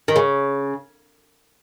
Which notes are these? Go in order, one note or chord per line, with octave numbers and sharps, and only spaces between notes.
D#3
C#3